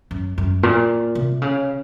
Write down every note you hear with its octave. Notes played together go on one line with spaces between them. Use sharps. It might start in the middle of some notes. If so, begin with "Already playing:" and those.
F#2
F#2
A#2
C3
C#3